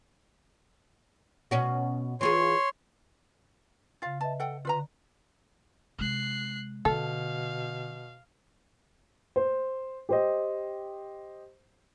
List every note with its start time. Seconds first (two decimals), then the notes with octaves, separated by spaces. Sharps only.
1.51 B2 C#4 F#4
2.21 E3 F4 G#4 C#5 C6
4.02 C#3 F4 F5 A6
4.21 B4 D#5 E5 A5
4.40 A4 F#5 G5
4.65 D3 F4 B4 A#5
5.98 C3 G#3 F#6 C7
6.85 B2 D3 A4 F5
9.36 C5
10.09 G4 C5 D#5